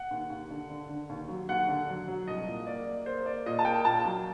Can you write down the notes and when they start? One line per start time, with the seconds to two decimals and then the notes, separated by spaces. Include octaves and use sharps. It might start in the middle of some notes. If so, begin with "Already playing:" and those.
Already playing: F#5
0.11 D#2
0.30 D#2
0.50 D3
0.70 D3
0.89 D3
1.09 D#2
1.28 F#3
1.49 D#2 F#5
1.68 D3
1.89 F#3
2.08 F#3
2.28 C2 D#5
2.47 A#2
2.67 A#3 D5
2.87 A#3
3.06 A#3 C5
3.26 A#3 D5
3.46 A#2 D#5
3.59 A5
3.65 A#3 G5
3.85 A#2 A5
4.05 F#3